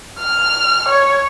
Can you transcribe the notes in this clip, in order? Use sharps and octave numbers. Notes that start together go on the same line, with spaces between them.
F6
C#5